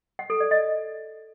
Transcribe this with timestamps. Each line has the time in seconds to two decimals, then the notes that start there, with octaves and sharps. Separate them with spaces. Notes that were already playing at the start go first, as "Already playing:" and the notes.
0.19 F#5
0.30 A4
0.40 D5
0.51 D#5